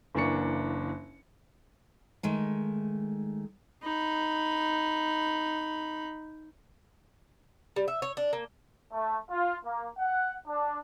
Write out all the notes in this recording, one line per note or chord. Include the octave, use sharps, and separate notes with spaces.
F#1 E3 A#3 D4 C#6 C#7
D#3 G#3 A3
D#4 B5
G3
E5
C#5
D4
A#3
A3
F4
A#3
F#5
D4